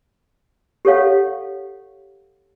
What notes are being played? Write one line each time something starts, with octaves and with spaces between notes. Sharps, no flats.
G4 A4 C#5 F5 F#5